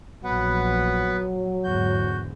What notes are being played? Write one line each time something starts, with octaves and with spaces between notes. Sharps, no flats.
A#1 F#3 B3 B4 F#5
E2 G#2 D3 F#4 G6